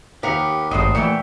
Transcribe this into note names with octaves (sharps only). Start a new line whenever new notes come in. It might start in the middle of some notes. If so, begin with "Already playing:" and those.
D#2 G4 A#4 B4 F#5
G#1 G2 A3 F#4 C5 D#5
A#2 E3 C#5 E5 G5